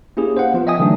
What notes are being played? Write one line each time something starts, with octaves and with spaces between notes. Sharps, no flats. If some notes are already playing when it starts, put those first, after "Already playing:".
A#3 C#4 E4 G4 G#4
C5 F5 F#5
F3 B3 F4
D#5 E5 G5 G#5 D#6
D3 E3 F#3 A3 D4 D#4